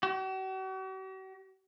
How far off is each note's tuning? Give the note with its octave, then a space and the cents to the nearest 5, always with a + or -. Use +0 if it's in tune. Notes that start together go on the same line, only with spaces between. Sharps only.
F#4 +45